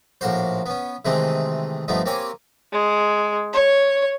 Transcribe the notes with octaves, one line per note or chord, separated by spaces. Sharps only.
A#1 A2 A#3 F#4 C5
B3 C#4
C3 D#3 E3 G#3 A3 C4
G2 F3 A3 B3 D#4
A#3 C4 G4 C#5 G#5
G#3
C#5